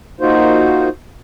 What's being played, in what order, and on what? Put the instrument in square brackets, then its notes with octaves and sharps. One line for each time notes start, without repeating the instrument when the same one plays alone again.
[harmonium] A#3 D#4 F4 F#4 C5